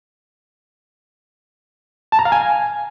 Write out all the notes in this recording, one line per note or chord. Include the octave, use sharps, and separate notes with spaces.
A5
A#5
F5
G#5